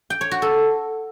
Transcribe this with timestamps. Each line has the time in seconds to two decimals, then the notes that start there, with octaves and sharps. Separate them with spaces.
0.10 G5
0.21 C#5
0.31 F#4
0.42 A4